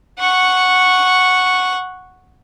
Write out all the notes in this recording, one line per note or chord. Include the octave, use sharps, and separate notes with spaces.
F#5 C#6